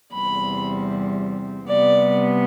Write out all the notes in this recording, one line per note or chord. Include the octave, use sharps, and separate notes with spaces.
E2 C3 G3 C4 B5
C3 G3 B3 D5